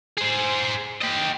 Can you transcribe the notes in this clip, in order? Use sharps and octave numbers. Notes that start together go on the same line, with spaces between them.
G#4 C5
G4 D#5